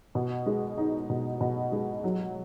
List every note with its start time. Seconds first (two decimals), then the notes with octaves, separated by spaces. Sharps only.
0.15 B2
0.46 G#3
0.78 D#4
1.10 B2
1.41 B2
1.72 G#3
2.04 F#3